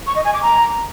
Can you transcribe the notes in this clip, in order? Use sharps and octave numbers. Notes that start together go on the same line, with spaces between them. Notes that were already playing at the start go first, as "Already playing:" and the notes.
C#6
D#5
G#5
D6
A#5